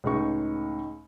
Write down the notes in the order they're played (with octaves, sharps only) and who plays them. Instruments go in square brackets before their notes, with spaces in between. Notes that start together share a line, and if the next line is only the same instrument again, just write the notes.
[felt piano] C#2 A2 G#3 D#4 C#6